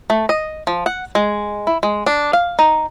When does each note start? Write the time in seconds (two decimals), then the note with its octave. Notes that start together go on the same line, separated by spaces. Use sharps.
0.10 A3
0.29 D#5
0.67 F3
0.86 F#5
1.15 G#3
1.67 E4
1.83 G#3
2.06 D4
2.33 F5
2.59 D#4